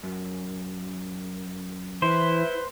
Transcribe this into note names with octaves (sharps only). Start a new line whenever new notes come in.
F#2
E3 E4 B4 C5